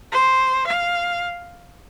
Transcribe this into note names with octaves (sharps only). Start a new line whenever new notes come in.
C5
F5